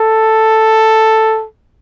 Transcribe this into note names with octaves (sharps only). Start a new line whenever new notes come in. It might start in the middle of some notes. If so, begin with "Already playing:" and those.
Already playing: A4